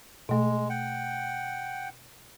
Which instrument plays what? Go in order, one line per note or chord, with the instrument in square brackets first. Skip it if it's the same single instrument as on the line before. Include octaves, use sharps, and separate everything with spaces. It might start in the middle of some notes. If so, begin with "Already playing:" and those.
[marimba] B2 A3 [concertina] G#3
[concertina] F#5 G5